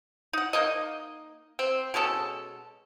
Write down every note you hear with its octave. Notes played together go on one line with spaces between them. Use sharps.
D#4 F#5
A#3 D#4 D#5
C4
B2 G#3 C#4 A4